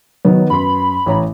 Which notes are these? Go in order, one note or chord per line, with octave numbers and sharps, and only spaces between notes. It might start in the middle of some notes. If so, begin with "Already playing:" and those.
D#3 F#3 B3
F#2 B4 B5 C6
A1 C#5 A#5